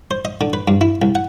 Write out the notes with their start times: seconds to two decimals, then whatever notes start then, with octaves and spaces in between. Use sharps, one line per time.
0.11 C5
0.25 D#5
0.41 D3
0.53 B4
0.68 G2
0.81 E4
1.02 C2
1.15 F#5